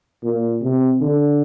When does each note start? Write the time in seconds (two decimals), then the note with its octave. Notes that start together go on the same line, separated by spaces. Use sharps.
0.24 A#2
0.62 C3
1.01 D3